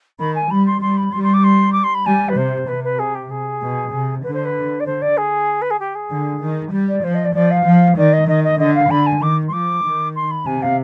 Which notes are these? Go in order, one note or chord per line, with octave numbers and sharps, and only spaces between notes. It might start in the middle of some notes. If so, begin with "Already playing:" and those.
D#3 B5
G#5
G3 B5
C6
G3 C6
B5
G3 C6
C6
D6
C6
D6
C6
B5
G3 G#5
B4
C3 C5
C3 B4
B4
G#4
G4
G#4
B2
C3
D3 B4
C5
B4
D5
D3 C5
D5
G#4
B4
G#4
G4
G#4
D3
D#3
G3
D5
F3 C5
D#5
D5
F3 D5
F5
F3
D#3 D5
D#5
D#3 D#5
D#5
D3 D#5
F5
D3 B5
G#5
D#3 D6
C6
F3 D6
D#3
C6
B5
C3 G#5
F5